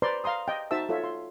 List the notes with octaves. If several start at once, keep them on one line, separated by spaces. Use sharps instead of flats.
B4 C5 D5 A#5 C6
F5 A#5 C6 D#6
D#5 G5
D#4 F#4 C5 E5 A5 E6
F4 A4 C#5 E5
C6